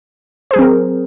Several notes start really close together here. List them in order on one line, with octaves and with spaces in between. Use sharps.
C5 G#4 F#3 C4 A#4